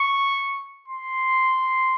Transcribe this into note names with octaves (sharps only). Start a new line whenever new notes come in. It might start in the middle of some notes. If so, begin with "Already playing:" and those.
Already playing: C#6
C6